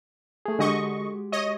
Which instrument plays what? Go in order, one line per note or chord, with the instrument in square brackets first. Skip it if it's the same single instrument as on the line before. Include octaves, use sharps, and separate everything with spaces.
[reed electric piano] A3 G#4
[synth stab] D3 D#5 C#6 [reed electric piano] G#3 F#4 G4
[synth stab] C#5 D#5